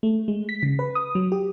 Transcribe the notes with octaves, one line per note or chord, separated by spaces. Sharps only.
A3
G#3
B6
C#3
B4
D#6
F#3
G4